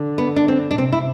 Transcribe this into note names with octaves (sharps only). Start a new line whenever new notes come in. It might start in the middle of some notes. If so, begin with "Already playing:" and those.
Already playing: D3
B3
D4
C4
D4
C3 C4
E4